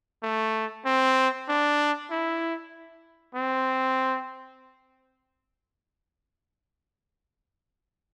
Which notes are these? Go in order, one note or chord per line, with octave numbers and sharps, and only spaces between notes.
A3
C4
D4
E4
C4